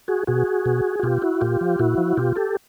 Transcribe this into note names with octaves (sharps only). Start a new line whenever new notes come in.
F#4 G#4
B2 F#4 G#4
B2
F#4
B2 F4 G4
E4 F#4
A#2 F4 G4
F3
A#2 E4 F#4
F3
B2 F4 G4
G4 A4